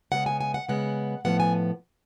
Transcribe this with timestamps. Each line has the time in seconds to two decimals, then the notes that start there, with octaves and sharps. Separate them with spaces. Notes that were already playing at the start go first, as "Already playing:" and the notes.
0.12 C#3 G#3 B3 F#5
0.26 G#5
0.41 G#5
0.54 F#5
0.68 C#3 G#3 B3 F#5
1.25 A2 F3 B3 F#5
1.40 G#5